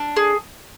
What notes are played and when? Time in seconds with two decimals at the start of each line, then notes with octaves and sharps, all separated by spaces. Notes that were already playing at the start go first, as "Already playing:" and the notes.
Already playing: D4
0.16 G#4